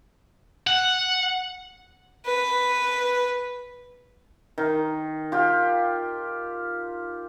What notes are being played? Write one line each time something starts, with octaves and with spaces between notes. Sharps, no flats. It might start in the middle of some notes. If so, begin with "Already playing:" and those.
F#5
B4
D#3
F4 G4